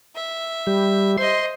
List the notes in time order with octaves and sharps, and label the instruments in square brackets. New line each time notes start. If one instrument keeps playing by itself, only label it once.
[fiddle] E5
[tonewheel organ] G3
[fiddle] C5 D#5 [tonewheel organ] C6